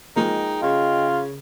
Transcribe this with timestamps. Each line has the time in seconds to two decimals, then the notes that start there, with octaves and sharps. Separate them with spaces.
0.16 F3 G#3 A#3 D#4 G#4 D#5 G5
0.62 C#3 F4